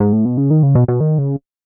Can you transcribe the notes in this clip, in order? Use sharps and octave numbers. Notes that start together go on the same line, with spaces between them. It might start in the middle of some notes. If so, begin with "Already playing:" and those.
G#2
A2
B2
C#3
D#3
C#3
B2
B2
D#3
C#3